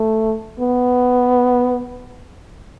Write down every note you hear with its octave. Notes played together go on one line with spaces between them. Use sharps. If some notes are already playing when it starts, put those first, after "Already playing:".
Already playing: A3
B3